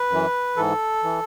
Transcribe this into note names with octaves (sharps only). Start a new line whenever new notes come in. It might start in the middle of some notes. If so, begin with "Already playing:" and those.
Already playing: B4
F#2 E3
G#2 E3 A4
E3